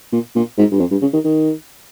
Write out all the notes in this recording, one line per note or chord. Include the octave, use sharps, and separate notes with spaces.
A#2
A#2
G#2
G2
F2
G2
C#3
D#3
D#3